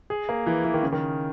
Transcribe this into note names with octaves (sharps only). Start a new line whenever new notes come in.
G#4
A#3
E3
E3
D#3
C#3
D#3